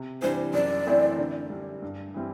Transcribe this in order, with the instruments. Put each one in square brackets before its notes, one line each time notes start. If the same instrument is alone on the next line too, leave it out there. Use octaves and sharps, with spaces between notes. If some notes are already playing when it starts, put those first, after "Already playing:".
Already playing: [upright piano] C3
[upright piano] E3 G3 D4 [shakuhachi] C5
[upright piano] F#2 [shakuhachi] D5
[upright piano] E3 A3 C4 E4
D3
G3 D4
G2
E3 G3 C4 E4